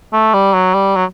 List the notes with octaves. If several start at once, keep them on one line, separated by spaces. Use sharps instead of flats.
A3
G3
F#3
G3
F#3